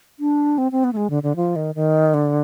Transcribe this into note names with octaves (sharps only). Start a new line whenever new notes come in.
D4
C4
C4
B3
A3
G#3
D3
D3
F3
D#3
D#3
D3